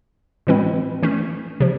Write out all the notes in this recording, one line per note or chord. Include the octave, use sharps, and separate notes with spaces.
A2 E3 G#3 C4 E4
E3 A3 C#4
C3 F3